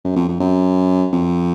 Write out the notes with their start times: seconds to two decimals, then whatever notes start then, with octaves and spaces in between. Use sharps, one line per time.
0.05 F#2
0.16 F2
0.29 F2
0.40 F#2
1.13 F2